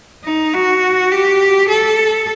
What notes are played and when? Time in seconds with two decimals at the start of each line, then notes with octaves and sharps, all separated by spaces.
0.25 D#4
0.53 F#4
1.11 G4
1.68 A4